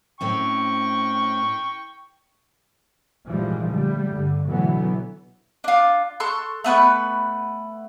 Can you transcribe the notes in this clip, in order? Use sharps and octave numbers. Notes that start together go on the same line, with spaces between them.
A2 C4 C#4 G5 C#6
G#1 A#2 E3 F3 G3 G#3
D3 G3 A3
G2 D3
B2 D3 E3 F#3 A3 B3
D4 F4
A4 C6 C#6 F#6
A3 B3 B4 C#6